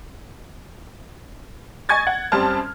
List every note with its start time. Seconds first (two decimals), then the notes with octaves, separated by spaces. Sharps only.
1.89 D#5 G#5 C#6 G#6 A6
2.07 F#5
2.32 F#2 G3 C4 C5 A5 F6